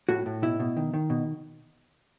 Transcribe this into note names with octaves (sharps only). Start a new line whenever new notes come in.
A2 F#4
A2
B2 E4
B2
D#3
D#3
B2